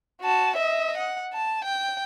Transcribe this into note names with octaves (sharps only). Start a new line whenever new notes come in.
F#4 A5
D#5 E5
F#5
A5
G5